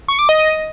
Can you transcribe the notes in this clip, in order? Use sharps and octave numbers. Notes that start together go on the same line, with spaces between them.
C#6
D6
D#5